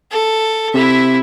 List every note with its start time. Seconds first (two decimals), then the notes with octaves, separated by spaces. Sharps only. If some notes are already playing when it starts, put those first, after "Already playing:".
0.12 A4
0.74 C3 E4 E5